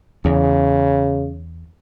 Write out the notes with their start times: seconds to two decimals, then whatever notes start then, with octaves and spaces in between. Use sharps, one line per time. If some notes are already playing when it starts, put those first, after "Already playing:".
0.25 E2 C#3